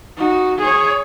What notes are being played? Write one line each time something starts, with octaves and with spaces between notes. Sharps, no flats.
D#4 F#4
G#4 C#5